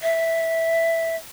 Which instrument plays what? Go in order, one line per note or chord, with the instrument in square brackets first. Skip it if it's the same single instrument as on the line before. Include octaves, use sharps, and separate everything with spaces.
[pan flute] E5